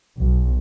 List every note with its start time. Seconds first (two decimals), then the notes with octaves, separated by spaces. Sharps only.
0.18 B1